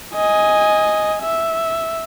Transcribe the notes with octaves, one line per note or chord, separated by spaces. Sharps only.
D#5 G#5
E5